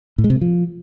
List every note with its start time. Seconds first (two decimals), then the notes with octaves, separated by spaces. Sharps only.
0.18 A2
0.24 G#3
0.30 C3
0.36 A3
0.41 F3